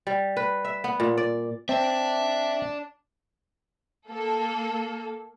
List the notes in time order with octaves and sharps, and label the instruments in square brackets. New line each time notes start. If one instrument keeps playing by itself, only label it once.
[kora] G3
B4
E5
B3
A#2
D5
[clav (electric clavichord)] C4 [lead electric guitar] D5 A5 [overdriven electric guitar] E5
[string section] A#3 A4